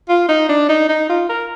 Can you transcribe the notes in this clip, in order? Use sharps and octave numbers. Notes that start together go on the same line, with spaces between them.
F4
D#4
D4
D#4
D#4
F4
A#4